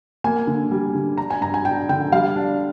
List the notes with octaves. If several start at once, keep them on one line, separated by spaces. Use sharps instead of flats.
A#3 G#5
D3
G3
D3
D4 A#5
G#5
G2 A#5
G#5
D4 G5
D3 G5
G3 F5
D4